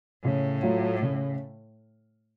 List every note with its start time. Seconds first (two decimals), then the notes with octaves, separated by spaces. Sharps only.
0.24 A2 C#3
0.63 F#3 A3 F4
1.02 C#3